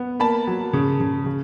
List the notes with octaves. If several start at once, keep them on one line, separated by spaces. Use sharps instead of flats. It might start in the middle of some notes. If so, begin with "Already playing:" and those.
Already playing: B3
A#3 A5 B5
F#3
C#3
C#3
C#3